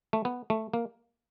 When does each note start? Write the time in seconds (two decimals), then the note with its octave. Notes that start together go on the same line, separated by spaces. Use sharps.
0.13 A3
0.25 B3
0.50 A3
0.74 A#3